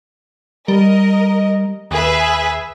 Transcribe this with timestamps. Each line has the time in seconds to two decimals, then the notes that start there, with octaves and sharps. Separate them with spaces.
0.68 G3 A#4 D#5
1.91 D#2 G#4 B4 E5